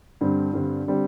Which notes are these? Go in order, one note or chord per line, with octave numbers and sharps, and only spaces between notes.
G2 D3 G3 C4
G2 D3 G3 C4
D3 G3 C4